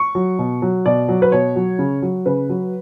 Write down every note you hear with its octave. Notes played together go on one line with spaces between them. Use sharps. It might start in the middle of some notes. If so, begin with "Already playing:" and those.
Already playing: C#6
F#3
B2
F#3
B2 D5
F#3
B4
B2 C#5
F#3
C#3
F#3
C#3 B4
F#3